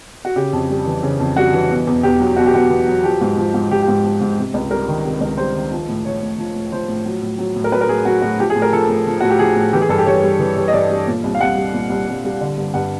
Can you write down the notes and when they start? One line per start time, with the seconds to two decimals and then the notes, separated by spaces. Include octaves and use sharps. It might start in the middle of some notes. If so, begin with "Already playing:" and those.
0.25 F#4
0.36 C#3 G4
0.53 F2
0.70 G3
0.86 E3
1.03 C#3
1.20 F2
1.36 G3 F#4
1.53 E3
1.71 B2
1.87 E2
2.03 E2 G4
2.20 F#3
2.36 B2 F#4
2.46 G4
2.54 E2 F#4
2.70 E2
2.87 F#3
3.03 F3 G4
3.21 G#2
3.37 F3
3.54 G#2
3.71 F3 G4
3.82 G4
3.88 G#2
4.04 F3
4.21 G#2
4.38 C3
4.54 C#2
4.71 G3 A#4
4.88 D#3
5.05 C3
5.21 C#2
5.38 G3 C5
5.55 D#3
5.72 F3
5.89 A2
6.05 F3 C#5
6.22 A2
6.38 F3
6.55 A2
6.72 F3 C5
6.89 A2
7.06 F#3
7.22 A2
7.39 F#3
7.56 A2
7.64 A#4
7.72 F#3 B4
7.81 A#4
7.89 A2 G#4
8.05 F#3 F#4
8.22 A2 F#4
8.39 F3 G4
8.50 G#4
8.56 A2
8.62 A#4
8.72 F3 A4
8.89 A2
9.06 F3
9.20 A2 F#4
9.30 G4
9.39 F3 G#4
9.56 A2
9.73 E3 G4
9.82 G#4
9.89 G2 A4
9.98 G4
10.06 G2 C#5
10.23 G3
10.39 E3
10.56 G2
10.68 D#5
10.73 G2 D5
10.90 G3
11.07 A#2
11.24 C2
11.35 F5
11.41 C2 F#5
11.56 G3
11.74 A#2
11.90 C2
12.08 C2
12.24 G3
12.41 D3
12.58 G2
12.74 G2 F#5